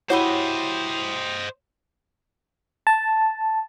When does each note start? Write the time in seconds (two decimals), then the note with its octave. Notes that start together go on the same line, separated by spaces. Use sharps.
0.10 E4 F#4 G4 C5 C#5 D#5 E5 B5
2.87 A5